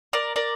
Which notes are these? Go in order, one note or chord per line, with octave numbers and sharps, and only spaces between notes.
A#4 D5
A#4 D5